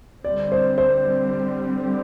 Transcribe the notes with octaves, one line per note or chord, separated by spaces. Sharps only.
D3 G3 C4 D5
C5
C5